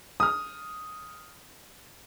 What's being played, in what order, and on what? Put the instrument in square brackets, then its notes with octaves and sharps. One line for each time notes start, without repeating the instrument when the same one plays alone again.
[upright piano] D#6 F6